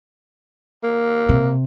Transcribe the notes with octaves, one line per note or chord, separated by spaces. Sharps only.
A#3
C3